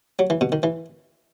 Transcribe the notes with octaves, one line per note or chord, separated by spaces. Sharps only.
F#3
E3
B2
D#3
E3